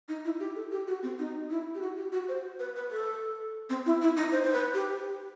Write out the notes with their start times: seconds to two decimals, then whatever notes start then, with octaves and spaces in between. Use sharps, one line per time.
0.09 D#4
0.25 E4
0.40 G4
0.55 A4
0.72 G4
0.87 F#4
1.03 C4
1.19 D#4
1.50 E4
1.75 G4
1.82 F#4
1.97 G4
2.12 F#4
2.28 C5
2.59 B4
2.76 B4
2.91 A4
3.70 C4
3.86 E4
4.01 E4
4.17 D#4
4.32 C5
4.44 C5
4.53 B4
4.74 G4